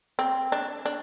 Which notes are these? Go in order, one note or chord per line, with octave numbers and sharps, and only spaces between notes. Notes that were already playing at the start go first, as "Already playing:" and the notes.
C4
D4
D4